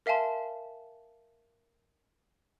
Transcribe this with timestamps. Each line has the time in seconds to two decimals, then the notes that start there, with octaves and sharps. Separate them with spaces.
0.06 A#4 E5 F5 G#5 A5 C6